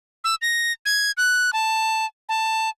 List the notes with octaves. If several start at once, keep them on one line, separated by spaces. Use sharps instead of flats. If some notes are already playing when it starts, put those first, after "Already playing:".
E6
A#6
G#6
F#6
A5
A5